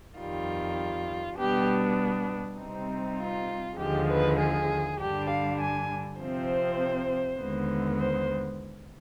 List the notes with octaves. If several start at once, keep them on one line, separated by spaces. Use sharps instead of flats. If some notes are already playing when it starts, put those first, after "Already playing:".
F2 D#3 G3 F4
B2 G3 B3 D4 G4
C3 G3 C4 D#4
F4
D#2 D3 F3 G#3 G4
B4
G#4
G2 D3 G3 D4 G4
F5
G#5
C3 F3 C4 C5
D#2 D3 G#3 B3
C5